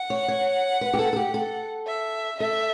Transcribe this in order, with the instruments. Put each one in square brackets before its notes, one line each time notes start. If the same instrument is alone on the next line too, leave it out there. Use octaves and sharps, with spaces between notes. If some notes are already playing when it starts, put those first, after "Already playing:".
Already playing: [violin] F#5
[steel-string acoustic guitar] C#5
C#5
B4
G4
A4
A4
G4
A4
[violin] E5
[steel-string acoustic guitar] A4 [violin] E5